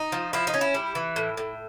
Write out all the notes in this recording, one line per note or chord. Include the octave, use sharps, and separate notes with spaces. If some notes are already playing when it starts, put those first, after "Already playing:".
Already playing: D#4
F3
F3 E4
D#4
C#4
E4
G3
E3
A2
A2